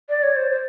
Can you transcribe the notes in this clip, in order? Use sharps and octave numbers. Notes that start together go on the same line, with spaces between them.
D5
C#5
C5
C5